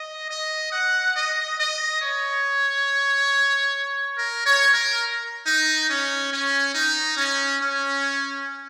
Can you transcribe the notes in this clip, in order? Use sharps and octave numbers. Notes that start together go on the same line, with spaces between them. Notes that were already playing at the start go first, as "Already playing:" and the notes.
Already playing: D#5
D#5
F#5
D#5
D#5
C#5
A#4
C#5
A#4
D#4
C#4
C#4
D#4
C#4
C#4